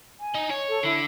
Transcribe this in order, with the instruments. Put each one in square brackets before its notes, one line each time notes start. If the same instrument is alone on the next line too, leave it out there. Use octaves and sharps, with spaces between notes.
[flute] G#5
[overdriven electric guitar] D#4 D#5
C#5
[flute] A4
[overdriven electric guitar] D3 [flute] E4